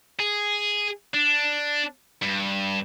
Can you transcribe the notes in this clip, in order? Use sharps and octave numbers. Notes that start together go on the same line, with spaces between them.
G#4
D4
G2